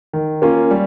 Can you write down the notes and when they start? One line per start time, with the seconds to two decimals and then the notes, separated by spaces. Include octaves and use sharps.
0.13 D#3
0.42 A#3 C#4 F4
0.71 G3